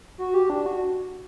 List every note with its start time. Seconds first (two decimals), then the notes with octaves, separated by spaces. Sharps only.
0.18 F#4
0.34 G4
0.50 D4
0.66 F#4